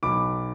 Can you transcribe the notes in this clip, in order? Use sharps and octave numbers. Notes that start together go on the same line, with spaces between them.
B1 B5 D6